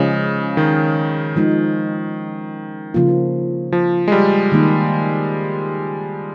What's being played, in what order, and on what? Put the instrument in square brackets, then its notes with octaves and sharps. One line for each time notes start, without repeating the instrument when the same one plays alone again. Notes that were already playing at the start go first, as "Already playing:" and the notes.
Already playing: [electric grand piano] C#3 [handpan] F3 G#3 C#4 G#4
[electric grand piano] D#3
[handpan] F3 G#3 D#4
C#3 F3 A#3 F4
[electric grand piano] F3
G#3
G3
[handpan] D#3 A#3 D#4